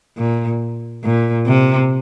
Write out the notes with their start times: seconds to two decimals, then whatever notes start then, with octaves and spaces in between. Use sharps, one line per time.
0.18 A#2
1.04 A#2
1.46 C3